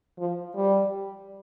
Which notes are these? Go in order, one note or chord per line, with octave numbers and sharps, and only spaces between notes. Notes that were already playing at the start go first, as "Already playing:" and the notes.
F3
G3